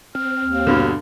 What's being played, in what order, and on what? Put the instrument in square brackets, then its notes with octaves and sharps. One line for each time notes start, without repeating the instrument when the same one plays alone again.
[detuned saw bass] C4 [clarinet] F6
[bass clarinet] D#2
[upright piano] G2 B2 D3